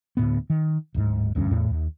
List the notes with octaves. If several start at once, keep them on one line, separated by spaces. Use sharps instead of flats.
D2 A2 B3
D#3
D1 G#2
E1 D2 G2 C#4
E2 A2
D#2